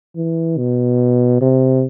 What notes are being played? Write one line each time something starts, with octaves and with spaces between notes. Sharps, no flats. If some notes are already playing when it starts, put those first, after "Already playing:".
E3
B2
C3